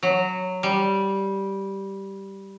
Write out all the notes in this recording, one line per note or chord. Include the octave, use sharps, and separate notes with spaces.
F#3
G3